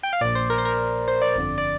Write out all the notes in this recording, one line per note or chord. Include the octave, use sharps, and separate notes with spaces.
G5
F5
A#1 A#2 D5
C5
A#4
C5
A#4
C5
D5
G1 F2 D3
D5